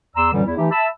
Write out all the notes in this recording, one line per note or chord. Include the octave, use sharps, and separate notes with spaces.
E2 D5 A#5 C6 E6
F#2 A#2 D3 E3 F#3 G3
E2 E4
E3 A3 D#4 G4
E5 A5 B5 E6